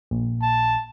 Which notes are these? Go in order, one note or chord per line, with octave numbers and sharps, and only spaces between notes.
A#1
A5